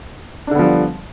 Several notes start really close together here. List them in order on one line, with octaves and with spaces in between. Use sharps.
D4 D3 B3 F3 G3